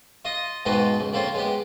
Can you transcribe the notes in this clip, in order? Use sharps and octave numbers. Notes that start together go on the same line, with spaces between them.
F4 D#5 D#6
G#2 B2 D#4 F4 B4 G5
C#2
D3 A#3 C4 F4 C#5
G#3 B3 G4